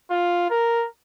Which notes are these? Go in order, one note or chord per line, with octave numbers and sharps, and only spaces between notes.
F4
A#4